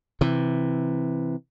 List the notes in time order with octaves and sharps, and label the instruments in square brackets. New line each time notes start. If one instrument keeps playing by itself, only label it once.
[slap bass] C3 E3